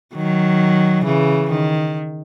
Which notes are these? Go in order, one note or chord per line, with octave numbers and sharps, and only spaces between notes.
D#3 F#3
C#3 E3
D#3